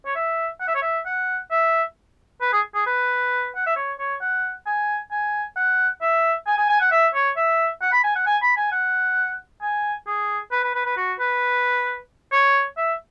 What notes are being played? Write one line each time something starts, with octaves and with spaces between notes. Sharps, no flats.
C#5
E5
F#5
E5
C#5
E5
F#5
E5
B4
G#4
G#4
B4
F#5
E5
C#5
C#5
F#5
G#5
G#5
F#5
E5
G#5
G#5
G#5
F#5
E5
C#5
E5
F#5
B5
G#5
F#5
G#5
B5
G#5
F#5
G#5
G#4
B4
B4
B4
B4
F#4
B4
C#5
E5